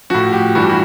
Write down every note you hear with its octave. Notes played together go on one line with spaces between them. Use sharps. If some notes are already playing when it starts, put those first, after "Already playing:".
A2 F3 F#4
G4
G2 E3 G3 F#4
G4
F#4